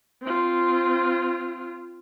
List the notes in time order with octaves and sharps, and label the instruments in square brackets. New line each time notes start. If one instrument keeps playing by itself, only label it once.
[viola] C4 F4